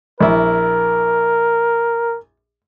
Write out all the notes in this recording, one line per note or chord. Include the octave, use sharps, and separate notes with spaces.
A#1 E4 A#4